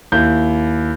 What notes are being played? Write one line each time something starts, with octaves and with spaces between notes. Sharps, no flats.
D#2 E4 G6